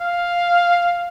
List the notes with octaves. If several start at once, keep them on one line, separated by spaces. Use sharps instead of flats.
F5